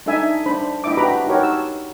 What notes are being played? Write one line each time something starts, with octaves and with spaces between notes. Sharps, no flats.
D4 D#4 A4 E5 G#5
D4 C5 B5
D4 E4 D#5 E5 D6
F#4 G4 B4 A#5 B5 D6
D#4 F#4 G4 A#4 C#5
A5 E6